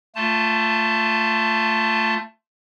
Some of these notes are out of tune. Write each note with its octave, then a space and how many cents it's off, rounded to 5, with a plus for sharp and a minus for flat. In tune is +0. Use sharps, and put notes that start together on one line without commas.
A3 +20 F4 +0 A5 +0